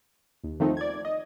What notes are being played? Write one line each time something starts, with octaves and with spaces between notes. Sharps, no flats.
D#2
D#3 F3 A3 C4 D#4
D5 G#6
D#5